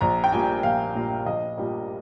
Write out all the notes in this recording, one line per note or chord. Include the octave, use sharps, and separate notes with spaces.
A#1 A#5
G5
A#2 G3 A#3 G#5
A#1 F5
A#2 G3 A#3
A#1 D#5
A#2 G3 A#3